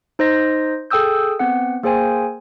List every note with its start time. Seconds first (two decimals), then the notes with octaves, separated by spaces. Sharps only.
0.19 D#4 C5 D#5 A#6
0.90 G#4 A4 G5 D#6 E6 G6
1.39 B3 C4 F#5
1.83 A#3 G#4 C5 G5 G#5